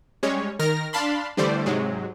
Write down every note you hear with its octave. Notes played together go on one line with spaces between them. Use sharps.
G3 G#3 C#4 C#5
D#3 A#4 F6 A#6
D4 F5 A5 B5 C6
D3 E3 G3 A3 C5 D5
G#2 C3 F#3 G#3